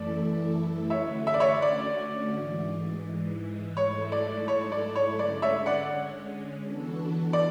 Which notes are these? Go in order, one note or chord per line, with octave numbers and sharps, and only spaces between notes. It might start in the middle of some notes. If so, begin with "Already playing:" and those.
Already playing: F#2 E3 A3 E4 A4 D5
D3 A3 C#4 F#4 C#5 E5
E5
D5
C#5 E5
D5
G#2 E3 G#3
G#2 F#3 A3 E4 A4 C#5
D5
C#5
D5
C#5
D3 G#3 C#4 D5
C#5 E5
D5 F#5
E3 B3 D4 F#4 A4
D5